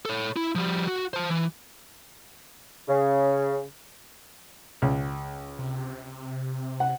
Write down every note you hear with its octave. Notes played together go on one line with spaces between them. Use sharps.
A4 C#5
E4
F3 G3
F#4
C5 A5
E3
C#3
C#2
C3
F#5